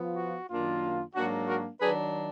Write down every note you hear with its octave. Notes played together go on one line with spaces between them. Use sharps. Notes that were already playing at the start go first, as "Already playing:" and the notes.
Already playing: F3 B3 F4
F#4
F#2 D#3 A#3 D4 F4
G#2 F#3 A#3 D4 F#4
F#4 A#4
D#3 F#3 D4 G#4 B4